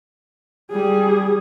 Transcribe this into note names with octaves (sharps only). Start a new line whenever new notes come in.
G3 G#4